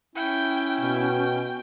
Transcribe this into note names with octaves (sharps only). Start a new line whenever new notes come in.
C#4 E4 G5
B2 G5